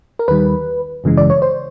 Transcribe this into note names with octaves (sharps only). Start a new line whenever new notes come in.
A#4
D#2 D#3 G3 B4
G#1 F#2 C#3 E3 G#3
D5
C#5
C5